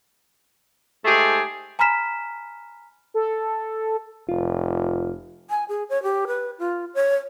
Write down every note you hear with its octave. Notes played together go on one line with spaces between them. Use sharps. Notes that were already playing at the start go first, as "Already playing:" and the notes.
G#2 A3 G4 G#4
G#5 A#5 B5 F6 B6 E7
A4
F1 F4
G#5
G#4
C#5
G4
B4
F4
C#5